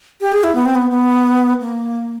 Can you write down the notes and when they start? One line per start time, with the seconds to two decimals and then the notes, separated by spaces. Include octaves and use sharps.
0.21 G4
0.32 G#4
0.44 E4
0.55 B3
0.65 C4
0.75 B3
0.90 B3
1.61 A#3